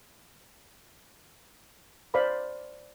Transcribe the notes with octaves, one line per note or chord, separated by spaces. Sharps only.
C5 D5 F5 B5 C6